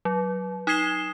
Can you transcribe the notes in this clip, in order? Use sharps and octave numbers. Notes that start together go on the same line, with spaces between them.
F#3
D#4 D#6 G#6 C7 E7 G7